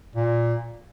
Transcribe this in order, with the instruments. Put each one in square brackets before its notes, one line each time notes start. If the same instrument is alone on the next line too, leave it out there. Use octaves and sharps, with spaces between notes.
[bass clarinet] A#2